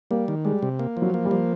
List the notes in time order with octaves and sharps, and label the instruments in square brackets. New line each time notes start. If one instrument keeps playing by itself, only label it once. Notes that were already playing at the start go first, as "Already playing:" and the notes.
[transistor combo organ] G3 [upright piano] A#3
[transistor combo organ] D#3
[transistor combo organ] G3 [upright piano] G#3
[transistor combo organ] C3
A#3
F3
[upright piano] F#3
[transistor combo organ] A#3
[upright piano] G3
[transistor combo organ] F3